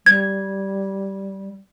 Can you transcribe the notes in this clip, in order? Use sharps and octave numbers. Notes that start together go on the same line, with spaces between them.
G3 G#6